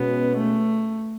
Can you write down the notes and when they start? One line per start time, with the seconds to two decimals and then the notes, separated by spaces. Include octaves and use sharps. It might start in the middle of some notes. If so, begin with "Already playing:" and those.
Already playing: B2 G#3 B3 C#4
0.37 A3